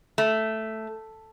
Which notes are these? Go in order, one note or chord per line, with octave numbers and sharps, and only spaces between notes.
A3